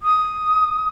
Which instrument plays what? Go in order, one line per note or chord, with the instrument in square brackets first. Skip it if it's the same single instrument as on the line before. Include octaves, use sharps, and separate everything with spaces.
[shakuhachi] D#6